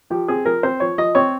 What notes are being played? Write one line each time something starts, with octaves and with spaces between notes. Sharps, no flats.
F3 G4
C4 G#4
F3 A#4
C4 C5
F3 C#5
F3 D#5
C4 C#5